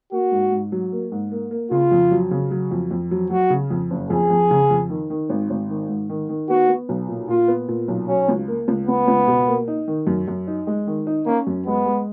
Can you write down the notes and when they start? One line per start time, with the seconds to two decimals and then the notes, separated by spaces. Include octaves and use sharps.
0.12 A#3 F#4
0.32 G#2
0.52 G#2
0.72 F#3
0.92 A#3
1.12 G#2
1.32 A#3
1.51 A#3
1.71 C#3 F4
1.91 F2
2.11 F#3
2.31 C#3
2.51 F#3
2.71 F2
2.91 F2
3.11 F#3
3.30 F#3 F#4
3.50 C#3
3.70 F2
3.90 F#1
4.10 F2 G#4
4.30 F2
4.51 C#3
4.70 F2
4.90 D#3
5.10 D#3
5.29 G#1
5.50 G#1
5.70 D#3
5.89 G#2
6.09 D#3
6.29 D#3
6.49 B3 F#4
6.69 B3
6.89 B1
7.08 A#2
7.28 A#2 F4
7.48 B3
7.68 A#2
7.88 B1
8.08 F#3 C#4
8.29 C#2
8.48 A#3
8.68 C#2
8.87 C#2 B3
9.08 C#2
9.28 B2
9.48 A#3
9.68 D#4
9.88 D#3
10.07 F#2
10.28 F#2
10.47 D#4
10.67 G#3
10.87 D#3
11.07 D#4
11.26 A#3 C#4
11.47 F#2
11.66 G#3 B3
11.86 G#3